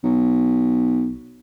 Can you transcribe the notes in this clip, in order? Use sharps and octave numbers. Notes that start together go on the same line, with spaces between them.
B1